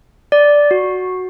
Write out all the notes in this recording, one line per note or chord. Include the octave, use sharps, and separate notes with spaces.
D5
F#4